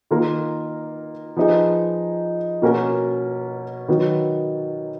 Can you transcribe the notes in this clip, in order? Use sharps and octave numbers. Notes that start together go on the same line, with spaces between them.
D#3 A#3 F4 A#4
F3 B3 D#4 G#4
B2 A#3 C#4 F#4 A#4
D#3 F#3 B3